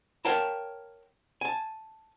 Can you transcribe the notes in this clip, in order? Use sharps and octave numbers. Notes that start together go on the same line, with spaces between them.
A#4 C#5 F5 G5 A5 A#5
G#5 A5